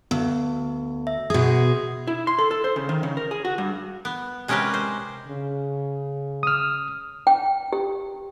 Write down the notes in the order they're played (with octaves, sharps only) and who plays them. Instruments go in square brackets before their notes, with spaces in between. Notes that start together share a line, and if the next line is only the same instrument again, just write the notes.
[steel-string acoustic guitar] D2 [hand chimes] B3
[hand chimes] E5
[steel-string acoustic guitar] B2 G#4 [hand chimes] F#4 D#6
[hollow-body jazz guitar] E4
C6
A4
A4
C5
C#3
D#3
C#3
A#4
G#4
F#4
G2
[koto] B3
C3 G#3 C#4 G4 A#4 B4
C5
[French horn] C#3
[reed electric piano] D#6 F6
[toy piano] G5
G4